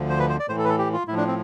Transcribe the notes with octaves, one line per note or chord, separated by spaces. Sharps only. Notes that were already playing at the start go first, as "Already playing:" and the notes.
Already playing: D2 D3 F3
C5
B4
C5
D5
A2 E3 C5
A4
B4
A4
G4
F4
A2 F3 E4
D4
C4